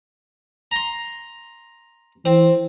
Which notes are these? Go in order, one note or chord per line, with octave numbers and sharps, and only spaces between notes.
A#5 C6
E3 C4 C5